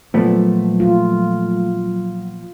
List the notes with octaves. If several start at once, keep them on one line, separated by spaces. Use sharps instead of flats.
A#2 F3 F#3 A3 B3
F4